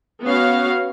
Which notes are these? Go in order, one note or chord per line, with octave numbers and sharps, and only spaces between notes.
B3 C#4 F#4 F5